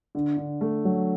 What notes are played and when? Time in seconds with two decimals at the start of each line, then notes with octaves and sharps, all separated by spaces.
0.15 D3
0.37 D3
0.61 A3
0.85 F#3